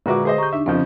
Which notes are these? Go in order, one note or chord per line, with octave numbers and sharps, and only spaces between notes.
A#2 D3 G#3 F#4 B4 E5 D6
G#4 C5 D#5
G4 A#5 C#6 G6
D4 D#4 E5
F2 C#3 F3 C4 D4 D#5 G6